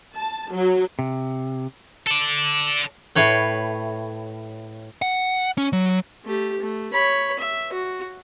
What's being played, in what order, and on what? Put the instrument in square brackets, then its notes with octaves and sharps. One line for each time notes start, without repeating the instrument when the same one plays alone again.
[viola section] A5
F#3
[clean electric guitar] C3
[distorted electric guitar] A4 D5
[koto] A2 B4 C#5 G5
[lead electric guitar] F#5
C#4
F#3
[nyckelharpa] A3 G4
A3
C#5 B5
E5
F#4